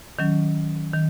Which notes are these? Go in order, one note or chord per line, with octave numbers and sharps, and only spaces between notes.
D#3 F#3 C#4
D#3